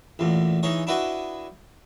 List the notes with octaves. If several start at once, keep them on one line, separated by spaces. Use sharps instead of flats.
A1 E2 A#2
E3 D#4 G#4 C#5 D#5
D4 E4 F#4 B4 D#5 G#5